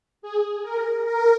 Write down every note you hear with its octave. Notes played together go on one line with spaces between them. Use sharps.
G#4
A#4
A#4